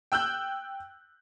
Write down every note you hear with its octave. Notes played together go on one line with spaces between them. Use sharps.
G5 E6 F#6 G6